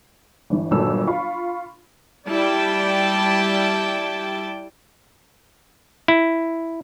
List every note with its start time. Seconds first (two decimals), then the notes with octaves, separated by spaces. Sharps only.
0.50 G1 E3
0.71 G1 A#2 D#3 F#3 A4 E6
1.07 F4 F5 B5 C#6
2.27 G3 E4 D5 G5 A5
6.08 E4